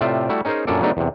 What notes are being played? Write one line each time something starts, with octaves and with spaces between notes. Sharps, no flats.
A2 C3 F4 D5 E5 G5
G3 A3 E4 F#4
C#4 D#4 G#4 A#4 C5
F#2 A#2 C#4 D4 A4 D5
C#3 F#3 A3 B3 D4 D#4
E2 C3